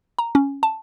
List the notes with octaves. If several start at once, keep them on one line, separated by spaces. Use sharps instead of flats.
A#5
C#4
A5